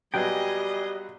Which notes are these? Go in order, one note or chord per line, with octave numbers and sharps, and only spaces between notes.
A#1 F#3 G3 B3 G#4 D#5 G5